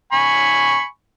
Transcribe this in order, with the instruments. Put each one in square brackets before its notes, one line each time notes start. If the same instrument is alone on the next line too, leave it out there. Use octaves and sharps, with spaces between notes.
[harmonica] G#5 B5 C#6